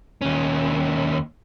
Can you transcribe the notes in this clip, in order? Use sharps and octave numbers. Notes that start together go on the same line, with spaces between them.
D#2 C#4